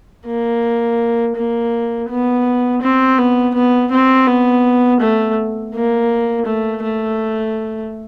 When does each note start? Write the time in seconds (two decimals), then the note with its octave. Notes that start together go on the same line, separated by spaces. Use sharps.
0.26 A#3
1.36 A#3
2.09 B3
2.82 C4
3.18 B3
3.54 B3
3.91 C4
4.27 B3
5.00 A3
5.74 A#3
6.46 A3
6.83 A3